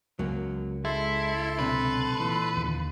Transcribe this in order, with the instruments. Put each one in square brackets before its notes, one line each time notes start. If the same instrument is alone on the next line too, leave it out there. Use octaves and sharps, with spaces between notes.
[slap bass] C#2 [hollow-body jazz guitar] F#3 A#3
[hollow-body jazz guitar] G#3 [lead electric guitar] E4 [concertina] A4 A5 C6
[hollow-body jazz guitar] B1 C3 D4 [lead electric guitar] B4
[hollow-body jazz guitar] A#2 E3
[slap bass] D#2 D3